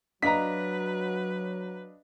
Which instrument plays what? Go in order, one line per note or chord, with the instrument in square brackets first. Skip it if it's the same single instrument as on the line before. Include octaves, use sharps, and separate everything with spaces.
[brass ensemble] F#3 [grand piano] D4 D#5 F5 [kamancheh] B4 [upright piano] A#5 B6